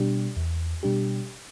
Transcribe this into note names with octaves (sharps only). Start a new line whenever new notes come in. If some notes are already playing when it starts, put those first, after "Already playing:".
Already playing: B2 G3 D4 G4
E2
B2 G3 D4 G4